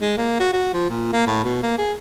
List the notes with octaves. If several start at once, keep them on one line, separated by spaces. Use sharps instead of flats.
G#3
A#3
F#4
F#4
F3
A#2
A#3
A2
B2
A#3
G#4